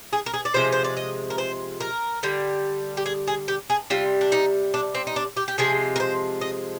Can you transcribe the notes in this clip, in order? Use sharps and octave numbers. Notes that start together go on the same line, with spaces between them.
G#4
A#4
G#4
D5
C3 F3 G#3 C5
C5
D5
D#5
A#4
C5
A#4
D3 G3
G4
G#4
G#4
G4
G#4
C3 G3 F4
D4
D#4
D4
C4
D#4
D4
G4
G4
C3 F3 G#3 G#4
A#4
C5
D#5